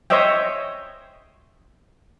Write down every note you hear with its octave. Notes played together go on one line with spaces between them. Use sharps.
C5 C#5 D#5 E5 G5